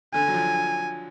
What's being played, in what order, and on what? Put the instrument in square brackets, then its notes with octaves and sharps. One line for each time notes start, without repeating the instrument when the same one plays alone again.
[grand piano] D3 [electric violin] G#5
[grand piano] F#3
F3